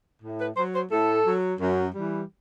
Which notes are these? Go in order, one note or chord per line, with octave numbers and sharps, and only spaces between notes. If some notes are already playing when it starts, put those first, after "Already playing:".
A2
B4
F#3 C5
C5
A2 A4
F#3
F#2
E3 G3